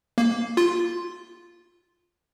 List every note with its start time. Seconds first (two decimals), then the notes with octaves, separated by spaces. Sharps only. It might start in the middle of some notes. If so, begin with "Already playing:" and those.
0.18 A#3
0.57 F4